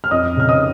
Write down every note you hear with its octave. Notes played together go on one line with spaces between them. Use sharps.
F6
F2 D#5 D#6
C#3 F6
D#5 D#6